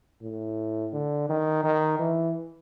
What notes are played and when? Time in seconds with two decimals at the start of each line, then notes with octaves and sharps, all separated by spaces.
0.22 A2
0.93 D3
1.29 D#3
1.64 D#3
1.99 E3